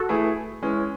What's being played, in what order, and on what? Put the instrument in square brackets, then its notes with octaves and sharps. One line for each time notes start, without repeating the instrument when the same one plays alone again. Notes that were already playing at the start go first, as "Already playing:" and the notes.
Already playing: [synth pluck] F#4 A4
[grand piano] E3 A3 E4 G#4
E3 G#3 C#4